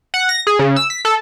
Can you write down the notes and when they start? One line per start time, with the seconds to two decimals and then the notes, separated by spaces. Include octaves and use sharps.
0.14 F#5
0.29 A#6
0.47 G#4
0.59 C#3
0.76 E6
0.90 B6
1.05 A4